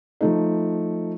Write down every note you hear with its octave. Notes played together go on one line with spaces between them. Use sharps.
F3 A3 D#4